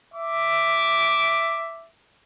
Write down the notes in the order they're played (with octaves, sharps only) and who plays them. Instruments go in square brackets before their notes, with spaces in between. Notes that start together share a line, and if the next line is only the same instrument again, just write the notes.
[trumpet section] E5 D6